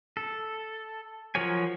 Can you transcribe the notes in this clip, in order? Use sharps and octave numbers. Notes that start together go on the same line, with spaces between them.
A4
F3 F#3 A#4 C#5 G#5